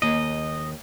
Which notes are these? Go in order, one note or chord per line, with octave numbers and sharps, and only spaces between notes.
D#2 D#5